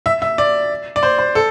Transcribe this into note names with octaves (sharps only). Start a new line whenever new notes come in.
E5
E5
D5
D5
C5
C5
A4